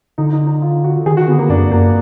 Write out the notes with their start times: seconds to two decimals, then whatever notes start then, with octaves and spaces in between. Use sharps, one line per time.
0.18 D3 D#4
0.33 D#4
0.47 D#4
0.62 F4
0.84 F#4
1.06 D#3 G#4
1.17 F#4
1.28 D3 B3
1.39 A#3
1.50 F#2 D4
1.72 F#2 A#3